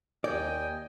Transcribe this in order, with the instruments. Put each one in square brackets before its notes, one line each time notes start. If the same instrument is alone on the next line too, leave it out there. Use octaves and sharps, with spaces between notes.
[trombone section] D#2 [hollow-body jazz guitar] D5 [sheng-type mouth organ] D#5 G5 G#5